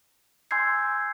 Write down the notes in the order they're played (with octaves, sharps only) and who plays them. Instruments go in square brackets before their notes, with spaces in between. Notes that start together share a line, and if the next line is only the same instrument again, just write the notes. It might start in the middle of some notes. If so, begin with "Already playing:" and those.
[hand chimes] G#5 C6 E6 G6 G#6 C7